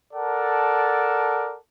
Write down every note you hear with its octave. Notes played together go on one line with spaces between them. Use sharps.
A4 A#4 D5 F#5 A5